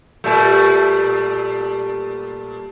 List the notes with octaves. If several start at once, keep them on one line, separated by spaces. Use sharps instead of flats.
A#2 G3 A3